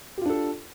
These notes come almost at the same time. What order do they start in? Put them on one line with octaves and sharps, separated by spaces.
G4 F4 D4 A4